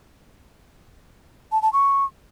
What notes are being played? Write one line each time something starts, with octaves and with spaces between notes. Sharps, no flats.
A5
A5
C#6